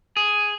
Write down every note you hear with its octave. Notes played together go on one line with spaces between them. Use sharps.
G#4